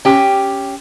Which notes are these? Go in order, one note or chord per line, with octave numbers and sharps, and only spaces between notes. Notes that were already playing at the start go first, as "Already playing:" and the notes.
C#4 G4